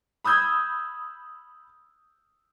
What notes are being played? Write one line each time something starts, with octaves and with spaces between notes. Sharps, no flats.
B5 D#6 E6 G6 G#6